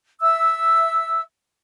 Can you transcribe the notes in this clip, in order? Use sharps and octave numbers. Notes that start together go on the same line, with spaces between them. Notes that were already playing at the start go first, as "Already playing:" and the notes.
E5 E6